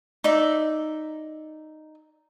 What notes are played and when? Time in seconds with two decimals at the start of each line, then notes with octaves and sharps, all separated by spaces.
0.24 D#4 D5 E5